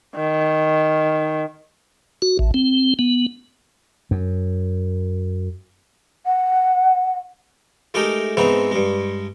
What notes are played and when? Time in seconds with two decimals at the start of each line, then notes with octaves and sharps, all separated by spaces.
0.15 D#3
2.22 F#4
2.39 A1
2.54 C4
2.99 B3
4.11 F#2
6.26 F#5
7.94 G#3 A3 D#4 G4 A#4
8.37 G#2 G#3 B3 C4 D#4 E5
8.71 G2 G#3